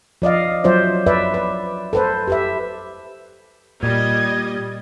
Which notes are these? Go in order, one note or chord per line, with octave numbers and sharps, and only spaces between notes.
F3 D5 D#5 F5
F#3 F4 C5 D5 E5
B4 D5 E5
B4
A4 B4 C5
G4 B4 E5
A#2 G3 D#5 G#6